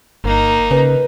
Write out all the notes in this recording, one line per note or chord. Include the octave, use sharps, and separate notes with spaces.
G1 A#3 D#4
C#3 B4